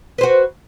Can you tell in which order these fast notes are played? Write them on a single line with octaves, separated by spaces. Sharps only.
B4 C5 F#4